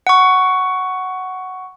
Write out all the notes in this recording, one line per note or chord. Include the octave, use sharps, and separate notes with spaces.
F#5 C#6